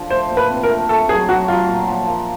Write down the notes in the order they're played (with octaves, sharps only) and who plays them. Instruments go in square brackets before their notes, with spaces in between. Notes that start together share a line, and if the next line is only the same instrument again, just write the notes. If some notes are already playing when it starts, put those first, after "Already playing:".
Already playing: [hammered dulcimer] D3 F3 D4
[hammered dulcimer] A3 [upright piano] C5
[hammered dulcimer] A#2
[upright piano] B4
[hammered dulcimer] C4
[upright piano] A#4
[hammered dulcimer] A3
[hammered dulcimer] A3 [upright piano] A4
[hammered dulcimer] F#3 [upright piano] G#4
[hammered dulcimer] F#3 [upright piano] F#4
[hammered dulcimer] F#3 [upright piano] F4
[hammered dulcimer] A#2
F3
A#3